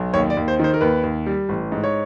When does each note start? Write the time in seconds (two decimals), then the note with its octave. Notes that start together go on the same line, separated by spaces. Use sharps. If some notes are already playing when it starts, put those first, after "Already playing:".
Already playing: B1
0.13 D#2 C#5
0.30 D5
0.37 D#2
0.48 C5
0.59 D#3 C5
0.74 A#4
0.81 D#2 B4
1.03 D#2
1.26 G3
1.49 A1
1.72 G#2
1.84 C#5